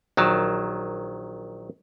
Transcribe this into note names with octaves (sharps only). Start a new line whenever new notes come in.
A#1 D#3 F#3 A5